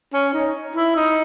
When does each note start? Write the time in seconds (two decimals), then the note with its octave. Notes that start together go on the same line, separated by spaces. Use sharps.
0.14 C#4
0.34 D#4
0.75 E4
0.96 D#4